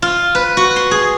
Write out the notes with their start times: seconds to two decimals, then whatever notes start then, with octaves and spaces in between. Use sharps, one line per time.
0.02 F4
0.35 B4
0.57 F#4
0.76 C6
0.91 G#4